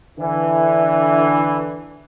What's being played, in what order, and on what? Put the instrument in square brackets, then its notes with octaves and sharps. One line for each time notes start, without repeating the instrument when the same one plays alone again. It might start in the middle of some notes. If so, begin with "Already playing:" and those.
[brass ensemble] D3 E3